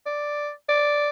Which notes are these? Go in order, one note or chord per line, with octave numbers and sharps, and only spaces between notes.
D5
D5